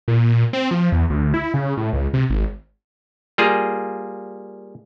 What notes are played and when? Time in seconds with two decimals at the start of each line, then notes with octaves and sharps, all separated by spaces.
0.08 A#2
0.53 C4
0.71 F3
0.92 E2
1.10 D2
1.34 E4
1.54 C#3
1.77 A2
1.93 C#2
2.14 C3
2.30 G#1
3.38 G3 A#3 F4 G#4